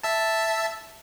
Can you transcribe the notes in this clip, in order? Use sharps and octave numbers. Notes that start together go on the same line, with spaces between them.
E5 A5